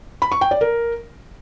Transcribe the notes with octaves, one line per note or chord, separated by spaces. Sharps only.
B5
C#6
G5
D5
A#4